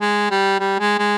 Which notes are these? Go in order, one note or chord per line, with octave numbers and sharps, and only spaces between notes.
G#3
G3
G3
G#3
G#3